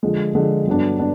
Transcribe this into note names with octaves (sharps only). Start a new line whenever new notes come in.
D3 F3 G#3
D3 F3 G#3
G2 D3 F#3 B3 D4
B3 D4